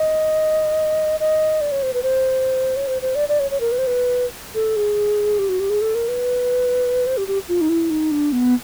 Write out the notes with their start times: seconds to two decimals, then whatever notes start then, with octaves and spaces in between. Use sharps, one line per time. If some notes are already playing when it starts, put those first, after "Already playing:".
Already playing: D#5
1.20 D#5
1.61 D5
1.72 C#5
1.83 C5
1.94 B4
2.03 C5
2.76 C#5
2.87 C5
3.02 C5
3.15 D5
3.29 D5
3.40 C#5
3.51 C#5
3.61 A#4
3.72 B4
3.78 C5
3.87 B4
4.55 A4
4.76 G#4
5.39 G4
5.49 F#4
5.60 G4
5.70 G#4
5.82 A4
5.95 A#4
6.08 B4
7.07 C5
7.17 G4
7.28 G4
7.49 F4
7.61 D#4
7.69 E4
7.90 D#4
8.11 D4
8.32 B3